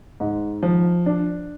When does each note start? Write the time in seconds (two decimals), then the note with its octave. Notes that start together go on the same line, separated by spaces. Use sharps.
0.20 G#2
0.63 F3
1.06 D4